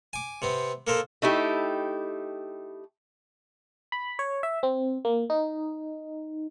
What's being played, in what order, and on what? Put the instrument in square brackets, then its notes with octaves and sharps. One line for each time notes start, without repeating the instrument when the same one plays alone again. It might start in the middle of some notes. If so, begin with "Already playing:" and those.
[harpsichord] G#5 D6
C3 B3 C4
A#3 A4 A#4 C5
[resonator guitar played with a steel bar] A3 D#4 E4 G4
[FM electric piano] B5
C#5
E5
C4
A#3
D#4